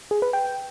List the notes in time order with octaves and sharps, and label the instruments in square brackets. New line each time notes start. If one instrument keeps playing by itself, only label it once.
[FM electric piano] G#4
B4
G5